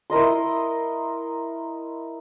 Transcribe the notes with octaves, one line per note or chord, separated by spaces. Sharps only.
E4 A#4 D#5 C6